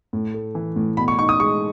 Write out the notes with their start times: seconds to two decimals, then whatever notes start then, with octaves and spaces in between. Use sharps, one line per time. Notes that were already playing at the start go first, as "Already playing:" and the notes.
0.13 A2
0.34 A3
0.55 E3
0.76 A2
0.97 B2 B5
1.08 C#6
1.19 D#4 C#6
1.29 D#6
1.40 G#3 C#6